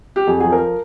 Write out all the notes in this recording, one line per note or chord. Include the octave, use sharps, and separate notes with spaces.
G4
F2 G#4
F3 G#4
A#4